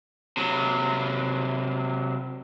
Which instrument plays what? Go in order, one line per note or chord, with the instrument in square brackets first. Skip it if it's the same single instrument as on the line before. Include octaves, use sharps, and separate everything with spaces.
[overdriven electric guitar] C3 F#3